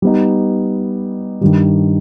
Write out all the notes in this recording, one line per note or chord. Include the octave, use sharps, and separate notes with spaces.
G3 B3 D#4
G2 D#3 G3